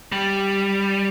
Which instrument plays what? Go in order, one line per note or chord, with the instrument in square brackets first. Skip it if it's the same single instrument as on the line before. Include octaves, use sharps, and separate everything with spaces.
[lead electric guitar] G3